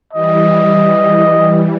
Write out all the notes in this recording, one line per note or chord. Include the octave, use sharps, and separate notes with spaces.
E3 G3 D#5